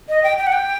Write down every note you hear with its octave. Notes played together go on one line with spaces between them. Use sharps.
D#5
G5
G5
F#5
G5